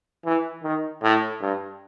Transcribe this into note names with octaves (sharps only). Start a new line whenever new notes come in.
E3
D#3
A2
G2